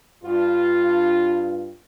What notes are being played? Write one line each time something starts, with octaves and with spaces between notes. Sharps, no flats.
G2 F4